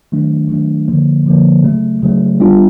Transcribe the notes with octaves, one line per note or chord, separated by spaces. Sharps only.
D#3 F#3 A3 D4
D#3 F#3 A3 D4
D3 F3 A#3
D3 F3 A#3
C#3 F#3 A3
C#3 F#3 A3
G3 B3 D4 F4